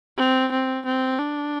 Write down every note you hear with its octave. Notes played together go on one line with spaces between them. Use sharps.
C4
C4
C4
D4